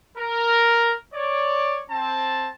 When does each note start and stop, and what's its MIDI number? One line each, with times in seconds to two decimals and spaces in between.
0.18 0.95 70
1.14 1.80 73
1.14 1.80 74
1.90 2.49 60
1.90 2.49 81